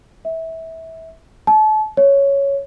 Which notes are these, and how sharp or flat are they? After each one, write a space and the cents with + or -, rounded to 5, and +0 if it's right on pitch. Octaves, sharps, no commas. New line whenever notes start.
E5 -20
A5 -35
C#5 +0